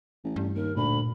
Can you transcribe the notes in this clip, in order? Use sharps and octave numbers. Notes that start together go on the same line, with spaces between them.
A1
G2
D#2 A#4
D2 A#2 B5